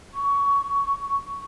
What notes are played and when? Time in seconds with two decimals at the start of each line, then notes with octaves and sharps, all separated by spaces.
0.14 C#6